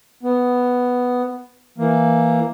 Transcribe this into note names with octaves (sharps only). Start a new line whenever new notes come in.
B3
E3 A#3